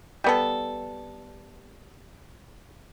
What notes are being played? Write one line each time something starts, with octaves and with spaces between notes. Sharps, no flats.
G3 B3 A4